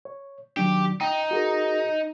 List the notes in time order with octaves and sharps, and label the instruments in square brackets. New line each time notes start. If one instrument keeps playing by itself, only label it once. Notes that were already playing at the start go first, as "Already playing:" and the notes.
[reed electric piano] C#5
[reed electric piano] D#3 F#3 D4 [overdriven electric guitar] G4
[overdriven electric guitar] D#4 [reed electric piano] G5
[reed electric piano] F#4 G#4 A#4